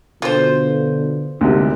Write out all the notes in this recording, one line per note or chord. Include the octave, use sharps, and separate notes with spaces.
B2 D3 F4 C5
G#1 D2 C3